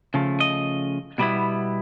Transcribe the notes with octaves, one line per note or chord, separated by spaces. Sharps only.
C#3 F3 A3
D#5
B2 G3 B3 E4